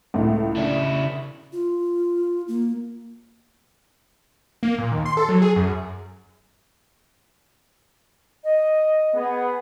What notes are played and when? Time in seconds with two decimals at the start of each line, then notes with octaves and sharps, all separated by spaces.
0.14 C#2 A2
0.56 C#3 D4 E4
1.53 F4
2.48 A#3
4.63 A#3
4.78 A#2
4.91 D#2
5.06 C6
5.17 A4
5.29 F#3
5.42 G#4
5.56 F#2
8.44 D#5
9.14 B3 G#4